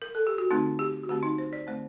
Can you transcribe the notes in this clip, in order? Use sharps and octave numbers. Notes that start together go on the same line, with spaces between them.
A#4
A4
G4
F#4
D3 A3 C4 D#4
G4
F#4
D3 A3 C4 G4
D#4
C5
D5
D3 A3 C4 C5